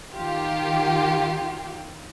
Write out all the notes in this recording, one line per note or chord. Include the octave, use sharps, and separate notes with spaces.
D#3 F4 G4